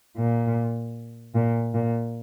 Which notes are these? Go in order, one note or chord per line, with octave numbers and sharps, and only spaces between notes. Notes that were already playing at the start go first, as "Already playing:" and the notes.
A#2
A#2
A#2